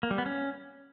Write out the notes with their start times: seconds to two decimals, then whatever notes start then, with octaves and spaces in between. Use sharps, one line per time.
0.03 A#3
0.11 G3
0.18 B3
0.26 C#4